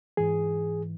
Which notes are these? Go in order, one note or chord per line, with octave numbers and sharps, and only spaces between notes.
G#2 E3 G#4